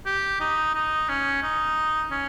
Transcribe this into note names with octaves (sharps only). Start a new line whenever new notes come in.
G4
D#4
D#4
C#4
D#4
C#4